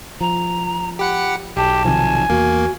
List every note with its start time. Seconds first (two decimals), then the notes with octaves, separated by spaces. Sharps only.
0.21 F3 A#5
0.99 G4 F#5 B5 C#7
1.57 B1 G4 A5
1.85 C3 D#3 F3 G#5
2.30 E2 A#3 F#4